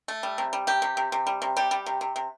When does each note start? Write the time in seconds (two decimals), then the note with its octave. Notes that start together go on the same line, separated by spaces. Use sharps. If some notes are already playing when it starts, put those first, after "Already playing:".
0.08 A3
0.23 G3
0.38 C3
0.53 G3
0.67 C3 G4
0.82 C3
0.97 C3
1.12 C3
1.27 G3
1.42 C3
1.56 G3 G4
1.71 G3
1.86 C3
2.01 C3
2.16 C3